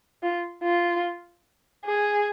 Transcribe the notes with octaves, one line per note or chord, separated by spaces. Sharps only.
F4
F4
G#4